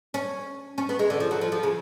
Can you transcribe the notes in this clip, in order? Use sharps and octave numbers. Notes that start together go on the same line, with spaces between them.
C#4
C#4
B3
G#3
D3
F3
F#3
F3
F3
C#3